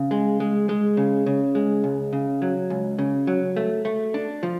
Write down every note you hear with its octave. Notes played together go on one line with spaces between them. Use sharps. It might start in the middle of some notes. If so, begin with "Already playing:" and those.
Already playing: C#3
G#3
G#3
G#3
C#3
C#3
G#3
C#2
C#3
F#3
C#2
C#3
F#3
A3
A3
D4
F3